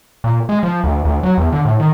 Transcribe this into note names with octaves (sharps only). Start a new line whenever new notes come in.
A#2
G#3
F3
D2
D2
F#3
E2
D3
A2
D#3